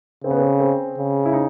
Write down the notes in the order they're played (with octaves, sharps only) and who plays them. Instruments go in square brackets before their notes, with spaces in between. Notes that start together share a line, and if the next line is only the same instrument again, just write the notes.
[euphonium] C#3 [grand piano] C4
[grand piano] B3
C4
C4
[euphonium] C#3
[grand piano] E4
D#4